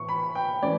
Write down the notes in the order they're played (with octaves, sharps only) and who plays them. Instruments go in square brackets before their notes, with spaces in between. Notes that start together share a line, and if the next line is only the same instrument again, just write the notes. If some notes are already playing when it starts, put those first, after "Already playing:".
Already playing: [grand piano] A2 E3 [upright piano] C#6
[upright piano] B5
G5
[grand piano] E3 A3 C#4 [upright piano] D5